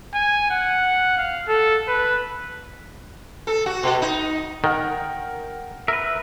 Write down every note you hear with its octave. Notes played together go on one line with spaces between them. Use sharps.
G#5
F#5
F5
A4
B4
A4
F#4
B2
D#4
D#3 A#4 F#5 G5
A#4 B4 E5